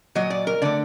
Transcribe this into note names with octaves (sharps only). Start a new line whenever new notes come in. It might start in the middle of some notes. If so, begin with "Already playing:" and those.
A#2 F#3 D#5
D5
A#4
D3 A3 D5